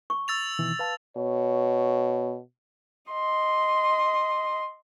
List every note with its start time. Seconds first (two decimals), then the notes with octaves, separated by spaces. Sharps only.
0.10 C#6
0.28 E6 A6 F7
0.59 B2 D#3 E3
0.79 B4 F5 A5
1.17 B2 C#5
3.12 D#5 C6